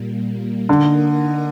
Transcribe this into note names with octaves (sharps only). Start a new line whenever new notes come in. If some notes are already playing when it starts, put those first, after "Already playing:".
Already playing: A#2 G3 A#3
D3 A#3 D#4 A#4 D#5